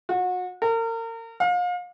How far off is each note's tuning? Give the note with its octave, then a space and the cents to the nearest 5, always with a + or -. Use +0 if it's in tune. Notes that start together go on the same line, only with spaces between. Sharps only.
F#4 -30
A#4 -35
F5 +35